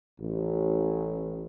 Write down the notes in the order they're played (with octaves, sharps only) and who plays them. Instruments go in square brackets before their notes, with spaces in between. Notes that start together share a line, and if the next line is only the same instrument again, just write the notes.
[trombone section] A1